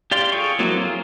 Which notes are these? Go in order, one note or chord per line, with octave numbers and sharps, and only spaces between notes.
G4 D5 F5 C6
F4 G#4 A4 G5 C#6
F3 F#3 A#3 C4 E4
F4 G#4 A#4